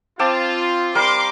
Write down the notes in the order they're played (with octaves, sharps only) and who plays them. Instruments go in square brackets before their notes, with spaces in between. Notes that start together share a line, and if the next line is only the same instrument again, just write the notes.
[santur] C4 A5 D6 [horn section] F4
[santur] G3 A#4 F5 [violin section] C6 D6